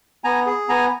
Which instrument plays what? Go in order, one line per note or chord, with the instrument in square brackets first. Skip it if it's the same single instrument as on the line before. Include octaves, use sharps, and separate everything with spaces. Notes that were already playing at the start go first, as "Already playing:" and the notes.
[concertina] B3 G#5 A#5
G#4
B3 G#5 A#5